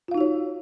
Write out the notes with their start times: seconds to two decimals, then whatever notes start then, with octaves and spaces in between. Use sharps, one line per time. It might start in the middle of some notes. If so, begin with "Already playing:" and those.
0.08 F4
0.11 F5
0.14 D#4
0.18 F#4
0.21 C#5